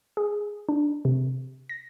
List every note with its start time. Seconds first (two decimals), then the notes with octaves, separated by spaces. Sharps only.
0.17 G#4
0.69 D4
1.05 C3
1.69 A#6